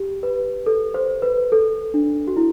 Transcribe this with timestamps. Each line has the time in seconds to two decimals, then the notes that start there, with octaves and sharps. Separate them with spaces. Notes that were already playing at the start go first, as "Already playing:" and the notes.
Already playing: G4
0.23 B4
0.66 A4
0.94 C5
1.22 B4
1.52 A4
1.94 D4
2.27 F#4
2.37 E4